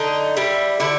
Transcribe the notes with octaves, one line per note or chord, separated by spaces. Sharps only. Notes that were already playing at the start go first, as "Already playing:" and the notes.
Already playing: D3 D#4
G3 E4
D3 E4